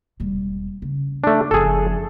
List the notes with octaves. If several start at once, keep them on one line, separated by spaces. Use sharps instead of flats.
E1 G3
C#3
A3 D4
F#1 F3 G#4 A4